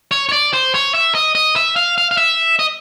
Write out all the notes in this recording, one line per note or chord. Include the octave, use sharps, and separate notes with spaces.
C#5
C#5
D5
C5
C#5
E5
D#5
D#5
E5
F5
F5
F5
E5
D#5